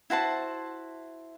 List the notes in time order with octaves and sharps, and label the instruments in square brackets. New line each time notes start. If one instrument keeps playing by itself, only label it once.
[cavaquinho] E4 F#4 C5 A5